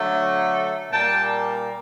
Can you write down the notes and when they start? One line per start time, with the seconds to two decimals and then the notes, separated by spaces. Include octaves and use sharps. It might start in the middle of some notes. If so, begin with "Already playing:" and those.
Already playing: D3 F#3 A3
0.91 A#2 G3 A#3 G5 A5